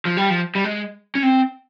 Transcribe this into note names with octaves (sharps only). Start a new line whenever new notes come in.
F3
G3
F3
G3
G#3
C#4
C4